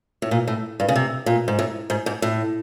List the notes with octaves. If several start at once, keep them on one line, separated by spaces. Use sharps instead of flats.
A2
A#2
A2
G2
C#3
C3
A#2
G#2
A2
G#2
G#2
A2